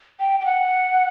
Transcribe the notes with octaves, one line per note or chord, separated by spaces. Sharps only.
G5
G5
F#5